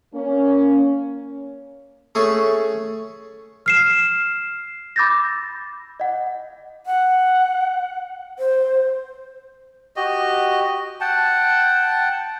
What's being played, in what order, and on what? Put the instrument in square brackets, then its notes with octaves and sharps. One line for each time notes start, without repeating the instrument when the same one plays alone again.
[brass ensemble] A#3 C#4
[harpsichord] A3 C#4 G#4 A4 G#5
[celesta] F6 C7 E7
B5 D6 E6 G6 A6 A#6
D#5 F#5
[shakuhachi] F#5
C5
[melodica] F#4 G4 D#5
F#5 G5 A5